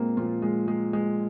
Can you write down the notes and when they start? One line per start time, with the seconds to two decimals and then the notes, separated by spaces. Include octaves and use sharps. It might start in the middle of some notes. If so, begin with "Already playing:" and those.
Already playing: A#2 G#3 A#3 C4
0.17 A#2 F3 F4
0.42 G#3
0.68 G#3
0.93 G#3